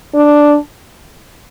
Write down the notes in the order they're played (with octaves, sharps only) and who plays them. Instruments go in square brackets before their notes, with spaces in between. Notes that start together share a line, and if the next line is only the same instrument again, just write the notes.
[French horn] D4